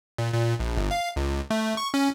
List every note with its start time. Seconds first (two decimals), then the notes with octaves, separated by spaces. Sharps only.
0.18 A#2
0.34 A#2
0.60 A#1
0.77 G1
0.91 F5
1.16 C#2
1.50 A3
1.77 C#6
1.94 C#4